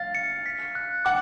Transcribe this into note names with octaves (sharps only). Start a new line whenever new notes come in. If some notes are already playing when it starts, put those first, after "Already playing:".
Already playing: F5 A6
C#7
B6
F#6
F#5 D6